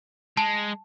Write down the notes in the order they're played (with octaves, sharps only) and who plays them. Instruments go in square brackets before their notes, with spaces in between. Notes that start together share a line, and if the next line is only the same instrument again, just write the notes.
[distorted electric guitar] G#3 [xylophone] A5